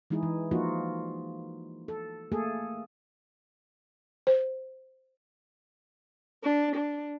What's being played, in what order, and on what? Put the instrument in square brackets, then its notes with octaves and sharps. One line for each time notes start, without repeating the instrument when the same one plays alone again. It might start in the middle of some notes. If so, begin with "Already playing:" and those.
[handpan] E3 G#3 D#4 E4 G#4
E3
F3 A#3 D#4 F4 F#4
A4
A3 A#3 G#4 A4
[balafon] C5
[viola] D4
D4